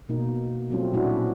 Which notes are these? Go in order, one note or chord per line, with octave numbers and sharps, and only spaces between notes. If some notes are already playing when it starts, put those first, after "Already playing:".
B2 A#3 D#4
F#3 G3 A3 C4 C#4 F4
A#2 A3 C#4 D4 E4 F#4